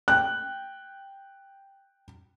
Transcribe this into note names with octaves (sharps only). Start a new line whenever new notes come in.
G5 F#6